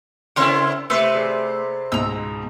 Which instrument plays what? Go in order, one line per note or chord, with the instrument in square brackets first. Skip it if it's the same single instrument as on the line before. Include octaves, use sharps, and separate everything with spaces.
[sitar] C#3 C4 E4 [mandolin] A#4 C6 F6
[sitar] C3 B4 C5 [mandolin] A3 [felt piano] E5 E6
[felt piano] G#4 D5
[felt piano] C#2 G#2 B2 [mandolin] A#5 E6